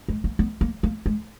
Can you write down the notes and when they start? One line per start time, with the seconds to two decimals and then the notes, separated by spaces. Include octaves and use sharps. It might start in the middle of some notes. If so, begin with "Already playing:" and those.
0.08 G#3
0.24 A#3
0.39 B3
0.61 A#3
0.83 A#3
1.06 G#3